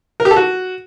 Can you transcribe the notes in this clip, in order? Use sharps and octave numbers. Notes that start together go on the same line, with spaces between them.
A#4
G4
A4
F#4